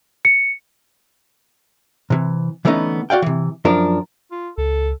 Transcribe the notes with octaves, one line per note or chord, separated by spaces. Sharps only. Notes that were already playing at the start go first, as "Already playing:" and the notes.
C#7
C3 E3
D3 E3 A3 B3 C#4 D#4
F#4 D5 F5 G5
C3 E3
F#2 F3 D4 A#4
F4
C#2 A4